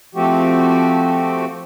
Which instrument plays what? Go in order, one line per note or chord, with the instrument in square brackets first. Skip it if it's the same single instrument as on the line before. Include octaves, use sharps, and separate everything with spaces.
[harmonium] F3 A3 C4 F#4 G4